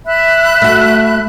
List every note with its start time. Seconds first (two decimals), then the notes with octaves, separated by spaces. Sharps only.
0.06 E5 B5 F#6
0.62 A3 F#4